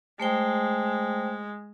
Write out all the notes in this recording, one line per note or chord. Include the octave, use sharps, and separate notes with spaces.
G#3 A3 C5 G5